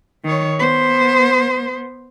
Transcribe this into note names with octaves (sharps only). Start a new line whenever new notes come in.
D#3 C#5
B3 C5